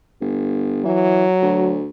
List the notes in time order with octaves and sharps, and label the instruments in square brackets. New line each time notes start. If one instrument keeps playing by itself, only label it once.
[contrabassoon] G1
[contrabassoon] E3 [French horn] F#3
[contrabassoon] D2